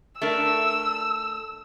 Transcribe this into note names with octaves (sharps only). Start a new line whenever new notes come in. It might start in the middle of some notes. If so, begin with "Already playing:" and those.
A3 D4 A#4 E6